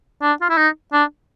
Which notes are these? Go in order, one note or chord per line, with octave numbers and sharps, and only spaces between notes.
D4
F4
E4
D#4
D4